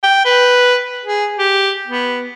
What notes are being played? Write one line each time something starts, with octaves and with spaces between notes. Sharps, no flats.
G5
B4
G#4
G4
B3